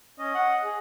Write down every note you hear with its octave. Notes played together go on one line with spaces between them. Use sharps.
C#4 D#5
F#5
G#4